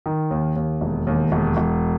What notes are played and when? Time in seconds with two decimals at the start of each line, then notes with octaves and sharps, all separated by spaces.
0.06 D#3
0.31 D#2
0.56 D#2
0.81 E1
1.07 D#2
1.32 E1
1.57 E1